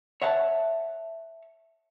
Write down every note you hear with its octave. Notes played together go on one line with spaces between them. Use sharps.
C#5 E5 F#5 A5